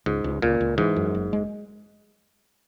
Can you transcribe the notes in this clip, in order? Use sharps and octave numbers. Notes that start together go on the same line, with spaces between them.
C#2 G#2
C#2
C#2 A#2
C#2
G#2 E3
F#2
F#1
G#3